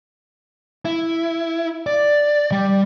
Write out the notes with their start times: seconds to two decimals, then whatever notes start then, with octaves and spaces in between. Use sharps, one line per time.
0.85 E4
1.87 D5
2.52 G3